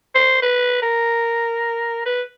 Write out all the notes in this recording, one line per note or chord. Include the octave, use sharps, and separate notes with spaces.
C5
B4
A#4
B4